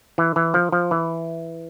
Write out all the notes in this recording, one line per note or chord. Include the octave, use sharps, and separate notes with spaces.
E3
E3
F3
F3
E3